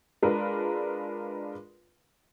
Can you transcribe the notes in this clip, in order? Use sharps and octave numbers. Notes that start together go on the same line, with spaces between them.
G#3 D4 F4 A#4 B4